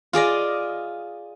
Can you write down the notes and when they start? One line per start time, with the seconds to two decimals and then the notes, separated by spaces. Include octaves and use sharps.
0.13 F4 G#4 D5 D#5